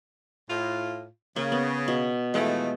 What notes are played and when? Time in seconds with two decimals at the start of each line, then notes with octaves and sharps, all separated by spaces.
0.49 A2 F4
1.36 C#3 A#3
1.52 B3
1.88 B2
2.34 E3 F3 G#3 A3